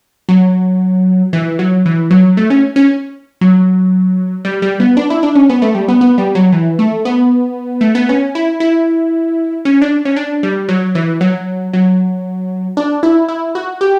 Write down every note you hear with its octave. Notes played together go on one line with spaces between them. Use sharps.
F#3
E3
F#3
E3
F#3
A3
C#4
C#4
F#3
G3
G3
B3
D4
E4
D4
C#4
B3
A3
G3
B3
B3
G3
F#3
E3
A3
B3
A3
B3
C#4
E4
E4
C#4
D4
C#4
D4
G3
F#3
E3
F#3
F#3
D4
E4
E4
F#4
G4